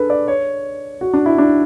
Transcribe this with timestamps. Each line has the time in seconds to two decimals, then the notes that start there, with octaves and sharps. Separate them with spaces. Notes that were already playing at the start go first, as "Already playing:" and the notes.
Already playing: D4 G#4 A4 B4
0.10 D5
0.28 C#5
1.01 F#4
1.13 D4
1.26 E4
1.38 D4